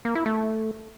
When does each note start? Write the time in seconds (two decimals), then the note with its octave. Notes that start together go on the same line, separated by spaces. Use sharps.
0.05 A#3
0.15 E4
0.26 A3